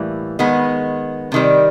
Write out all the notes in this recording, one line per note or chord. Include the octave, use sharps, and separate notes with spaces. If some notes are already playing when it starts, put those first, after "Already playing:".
Already playing: A2 E3 G3 A#3
D#3 G#3 B3
C3 D#3 G3